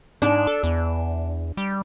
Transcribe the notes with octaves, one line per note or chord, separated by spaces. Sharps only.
G#2 D4
A4
E2
G3